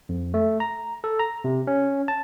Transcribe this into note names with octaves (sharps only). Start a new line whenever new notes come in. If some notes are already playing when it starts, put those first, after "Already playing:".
F2
A3
A#5
A4
A#5
C3
C#4
A5